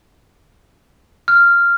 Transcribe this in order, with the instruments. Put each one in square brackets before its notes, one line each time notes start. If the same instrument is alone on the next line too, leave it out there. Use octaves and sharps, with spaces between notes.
[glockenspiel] F6